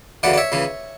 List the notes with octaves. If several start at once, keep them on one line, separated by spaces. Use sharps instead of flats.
D2 C#3 E3 D5 F#5
D5
C#5 E5
C#2 C#3 E3